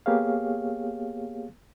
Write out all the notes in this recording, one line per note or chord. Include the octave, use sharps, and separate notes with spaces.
A#3 B3 G4 G#4 C#5 F5